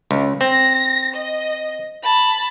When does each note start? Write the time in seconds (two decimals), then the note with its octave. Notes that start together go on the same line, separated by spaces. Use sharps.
0.11 C#2
0.41 C4 A#6
1.14 D#5
2.03 A5 B5